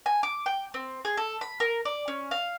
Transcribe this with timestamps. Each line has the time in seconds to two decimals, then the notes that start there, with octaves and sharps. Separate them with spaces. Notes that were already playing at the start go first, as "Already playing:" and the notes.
0.06 G#5
0.23 D6
0.46 G5
0.74 C4
1.05 G#4
1.17 A4
1.41 B5
1.60 A#4
1.85 D5
2.08 C#4
2.31 F5